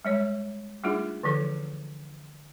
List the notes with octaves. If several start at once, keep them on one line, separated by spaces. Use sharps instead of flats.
G3 G#3 C#5
G3 A3 D4 D#4 F4 G#4
D3 E3 F3 A4